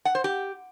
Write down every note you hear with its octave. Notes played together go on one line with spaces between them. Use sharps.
F#5
C5
G4